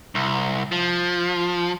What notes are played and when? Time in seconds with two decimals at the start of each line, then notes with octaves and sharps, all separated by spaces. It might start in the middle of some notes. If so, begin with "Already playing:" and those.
0.15 C2
0.72 F3